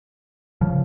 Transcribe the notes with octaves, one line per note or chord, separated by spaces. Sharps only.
C#3 F3